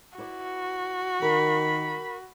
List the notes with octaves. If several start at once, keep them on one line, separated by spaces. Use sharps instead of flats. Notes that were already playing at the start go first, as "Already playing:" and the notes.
E4 F#4 B4 D5
D#3 A#4 B5